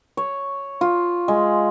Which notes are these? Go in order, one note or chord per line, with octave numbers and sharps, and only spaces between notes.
C#5
F4
G#3